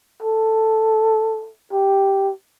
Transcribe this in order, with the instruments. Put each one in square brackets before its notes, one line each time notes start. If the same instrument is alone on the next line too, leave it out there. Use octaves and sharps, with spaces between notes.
[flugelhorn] A4
G4